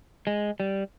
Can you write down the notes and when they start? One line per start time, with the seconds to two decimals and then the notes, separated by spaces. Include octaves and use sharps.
0.27 G#3
0.60 G3